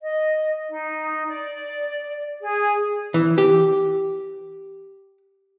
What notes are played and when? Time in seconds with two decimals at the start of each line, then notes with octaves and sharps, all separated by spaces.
0.02 D#5
0.70 D#4
1.28 D5
2.41 G#4
3.14 E3
3.38 G4